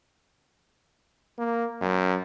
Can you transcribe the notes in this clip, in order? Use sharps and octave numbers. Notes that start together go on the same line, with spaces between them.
A#3
F#2